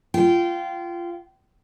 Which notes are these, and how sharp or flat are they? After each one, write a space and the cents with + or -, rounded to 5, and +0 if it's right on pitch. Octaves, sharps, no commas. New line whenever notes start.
F4 -20 G5 -25